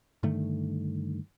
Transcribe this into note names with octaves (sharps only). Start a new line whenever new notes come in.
G2 D3 D#3 A3